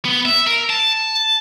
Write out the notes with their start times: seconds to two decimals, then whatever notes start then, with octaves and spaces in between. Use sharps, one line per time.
0.05 B3
0.25 E5
0.47 A#4
0.70 A5